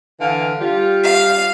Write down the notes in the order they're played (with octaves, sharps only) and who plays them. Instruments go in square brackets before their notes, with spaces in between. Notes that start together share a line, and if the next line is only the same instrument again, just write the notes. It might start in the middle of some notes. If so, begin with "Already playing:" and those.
[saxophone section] D3 E3 F5
G3 F4
[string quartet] F5